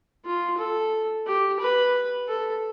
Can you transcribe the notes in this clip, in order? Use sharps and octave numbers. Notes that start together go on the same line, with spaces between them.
F4
A4
G4
B4
A4